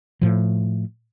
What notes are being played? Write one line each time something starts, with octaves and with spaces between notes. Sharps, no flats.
A2 F3